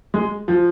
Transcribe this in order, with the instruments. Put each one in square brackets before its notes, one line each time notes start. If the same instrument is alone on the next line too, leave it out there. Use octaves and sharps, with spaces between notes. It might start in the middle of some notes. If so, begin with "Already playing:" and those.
[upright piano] G#3
F3